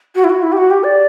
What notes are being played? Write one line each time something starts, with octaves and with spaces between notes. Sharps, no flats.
F#4
E4
F#4
E4
G4
F#4
G4
D5